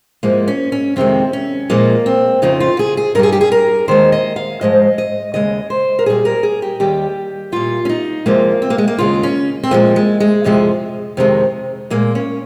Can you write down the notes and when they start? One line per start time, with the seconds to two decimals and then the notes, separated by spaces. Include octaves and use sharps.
0.23 G#2 F3 G#3 A#3
0.48 C#4
0.72 C#4
0.96 F2 C3 D#3 G#3 C4
1.33 C#4
1.70 A#2 F3 G#3 A#3
2.06 C4
2.42 F2 C#3 F3 D#4
2.60 F4
2.79 G#4
2.97 G#4
3.15 G2 A#4
3.19 G3 G#4
3.32 G4
3.41 G#4
3.52 A#4
3.88 D#2 D#3 G#3 C5
4.12 D#5
4.36 F5
4.61 G#2 F3 G#3 D#5
4.98 D#5
5.34 D#2 C#3 G#3 D#5
5.70 C5
5.99 A#4
6.06 A#2 G3 G#4
6.25 A#4
6.43 G#4
6.62 G4
6.80 D#2 D#3 G3 G4
7.52 A#2 G3 F4
7.85 C#4
7.89 D#4
8.26 F2 C3 F3 G#3 A#3
8.62 C4
8.70 A#3
8.78 G#3
8.88 A#3
8.98 D#2 C#3 G#3 F4
9.23 C#4
9.64 C4
9.71 A#2 F3 G#3 A#3
9.96 G#3
10.20 G#3
10.44 F2 C3 F3 G#3
11.17 F2 C3 D#3 G#3
11.90 A#2 G#3 A#3
12.15 C#4